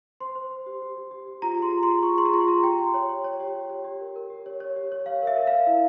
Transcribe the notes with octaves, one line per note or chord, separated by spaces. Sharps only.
C5 C6
C5
C5
G4
G4
G4
G4
G4
F4 A#5
G#4
C6
F4
C6
G#4
F4 C#6
G#4 C6
A#5
F4 C6
G#4 A#5
G4 G5
G4
C#5
C#5
C#5
G4
G4
C#5
G4
A#4
A#4
G4
C#5
C#5
G4
C#5
C#5 F5
A#4
E5
A#4
C#5 F5
E4